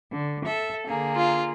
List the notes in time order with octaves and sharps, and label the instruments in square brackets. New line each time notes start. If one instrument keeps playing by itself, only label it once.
[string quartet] D3
A4 E5
D3 A#3 G#4
[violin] F4